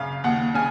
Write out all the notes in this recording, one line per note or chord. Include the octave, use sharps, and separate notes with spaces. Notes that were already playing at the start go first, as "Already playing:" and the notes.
Already playing: F#2 C#3 F5
D#2 F#5
C#3 G#5